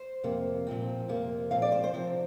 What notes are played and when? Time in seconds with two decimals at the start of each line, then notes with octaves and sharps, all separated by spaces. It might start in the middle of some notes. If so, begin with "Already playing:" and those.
Already playing: C5
0.23 F2 C3 A#3
0.67 A#2 F3 C4
1.08 F2 C3 A#3
1.51 A#2 F3 C4 F5
1.62 D5
1.72 C5
1.84 C5
1.94 C3 F3 C4